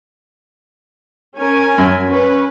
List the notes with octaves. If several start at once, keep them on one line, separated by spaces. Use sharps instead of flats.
C#4 A#4 G#5
F#2
C#4 B4